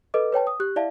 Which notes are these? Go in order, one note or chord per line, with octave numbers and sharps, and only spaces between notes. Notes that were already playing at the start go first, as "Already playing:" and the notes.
A4 B4 D#5 D6
B4 C#5 G5 A5
D#6
G4 F#6
E4 D5 E5 F5 A5